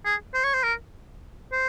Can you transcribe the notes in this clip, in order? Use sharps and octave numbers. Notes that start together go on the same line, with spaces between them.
G#4
C5
C#5
C5
A#4
C5